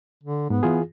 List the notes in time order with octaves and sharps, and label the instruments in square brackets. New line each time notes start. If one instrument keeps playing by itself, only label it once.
[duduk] D3
[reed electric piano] G#2 [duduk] B3
[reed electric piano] E3 F4 G#4